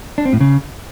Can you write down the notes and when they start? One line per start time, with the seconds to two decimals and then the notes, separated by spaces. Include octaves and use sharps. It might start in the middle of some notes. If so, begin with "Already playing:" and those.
0.18 D4
0.25 C4
0.33 A2
0.41 C#3